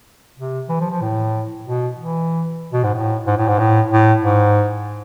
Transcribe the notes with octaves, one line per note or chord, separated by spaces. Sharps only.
C3
E3
F3
F3
A2
B2
E3
B2
G#2
A2
G#2
A2
G#2
A2
A2
G#2